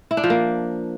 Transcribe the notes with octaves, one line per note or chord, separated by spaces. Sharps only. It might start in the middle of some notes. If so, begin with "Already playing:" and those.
E4
D4
F3
A#3